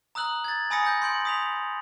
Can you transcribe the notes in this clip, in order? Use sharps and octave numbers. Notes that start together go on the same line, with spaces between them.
A#5 D#6 E6 F#6 F#7
G#6 A6
G#5 B5 D#6 E6 A#6 C#7
G6 A#6 C#7
C6 G6 D7 F#7
D#6 B6 F7